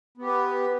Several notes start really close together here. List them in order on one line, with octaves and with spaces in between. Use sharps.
B3 G4 B4